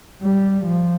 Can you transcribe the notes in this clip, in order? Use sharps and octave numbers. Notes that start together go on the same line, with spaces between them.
G3
F3